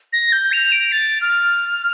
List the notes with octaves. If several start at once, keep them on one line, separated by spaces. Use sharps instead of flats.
A#6
G6
F7
D7
A6
F6